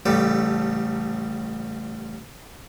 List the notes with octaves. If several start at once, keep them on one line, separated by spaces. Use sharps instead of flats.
A1 C#3 G3 A3 A4